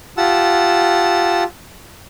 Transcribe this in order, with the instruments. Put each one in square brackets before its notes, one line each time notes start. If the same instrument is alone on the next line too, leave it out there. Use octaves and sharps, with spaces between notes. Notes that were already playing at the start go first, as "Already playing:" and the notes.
[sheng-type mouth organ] F4 G4 F#5 A5 E6